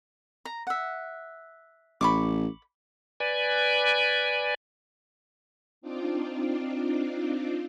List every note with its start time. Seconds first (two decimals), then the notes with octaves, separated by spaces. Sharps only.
0.45 A#5
0.67 E5 F#5
2.01 A1 B5 C#6 D6
3.20 B4 D5 G#5
5.81 C4 D4 D#4 F4 D6